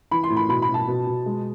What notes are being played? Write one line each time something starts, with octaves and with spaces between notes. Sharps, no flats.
E3 B5
C6
A2
B5
B2 B5
B5
B2
A5
B2
B2
G#3